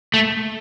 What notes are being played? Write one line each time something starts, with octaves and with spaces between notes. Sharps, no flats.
A3